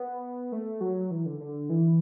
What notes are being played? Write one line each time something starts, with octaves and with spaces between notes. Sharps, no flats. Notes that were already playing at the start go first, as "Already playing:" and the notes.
Already playing: B3
A3
F#3
E3
D3
D3
E3